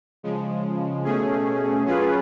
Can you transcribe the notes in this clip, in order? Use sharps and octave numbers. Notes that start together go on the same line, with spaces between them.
C#3 F3 G#3
B2 A3 C#4 G#4
F#3 C#4 F4 G#4 B4